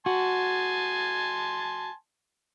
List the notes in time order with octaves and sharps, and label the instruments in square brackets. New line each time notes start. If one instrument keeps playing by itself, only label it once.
[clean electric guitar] F#4 [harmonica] G#5 A5 C6